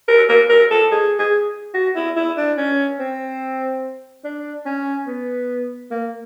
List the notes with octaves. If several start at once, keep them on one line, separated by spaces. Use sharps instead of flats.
A#4
A#4
A#4
A4
G#4
G#4
F#4
E4
E4
D4
C#4
C4
D4
C#4
B3
A#3